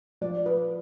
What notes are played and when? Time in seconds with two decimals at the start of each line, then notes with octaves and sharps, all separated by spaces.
0.21 F3 D5
0.46 B4